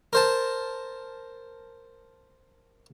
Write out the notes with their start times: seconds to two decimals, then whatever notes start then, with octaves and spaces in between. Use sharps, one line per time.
0.13 A#4 C5 A5